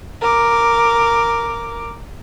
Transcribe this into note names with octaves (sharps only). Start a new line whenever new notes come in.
A#4 D6